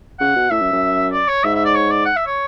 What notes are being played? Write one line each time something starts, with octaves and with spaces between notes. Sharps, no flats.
C#3 F#5
B2
A2 E5
F#2
F#2
D5
C#5
G#2 E5
E5
D5
C#5
D5
F#5
E5
C#5